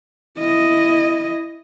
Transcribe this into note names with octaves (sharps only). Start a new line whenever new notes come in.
E4 D#5